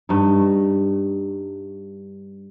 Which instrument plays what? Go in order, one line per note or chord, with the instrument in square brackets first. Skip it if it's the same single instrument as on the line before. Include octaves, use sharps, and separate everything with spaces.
[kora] G2 D#4